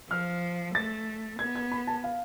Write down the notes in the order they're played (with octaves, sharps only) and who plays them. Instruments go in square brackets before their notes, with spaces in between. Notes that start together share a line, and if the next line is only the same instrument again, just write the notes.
[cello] F3 [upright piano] F6
[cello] A3 [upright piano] A6
[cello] B3 [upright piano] G#6
[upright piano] G#6
B5
A5
F5